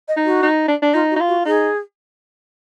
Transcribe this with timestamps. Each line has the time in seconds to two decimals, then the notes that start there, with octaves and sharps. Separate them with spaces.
0.08 D#5
0.16 D#4
0.25 F#4
0.42 D#4
0.68 D4
0.82 D4
0.93 D#4 F4
1.11 F#4
1.16 D#4
1.20 F4
1.28 F#4
1.45 D#4 G#4